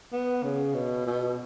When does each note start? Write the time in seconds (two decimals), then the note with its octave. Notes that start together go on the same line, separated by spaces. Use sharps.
0.12 B3
0.43 C#3
0.74 B2
1.06 B2